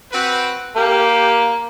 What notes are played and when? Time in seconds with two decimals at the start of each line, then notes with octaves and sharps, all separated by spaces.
0.12 C4 F#4 B4
0.76 A#3 G4